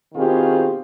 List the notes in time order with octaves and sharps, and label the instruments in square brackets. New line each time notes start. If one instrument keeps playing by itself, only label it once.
[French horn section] B2 D#3 C4 F4 G4 G#4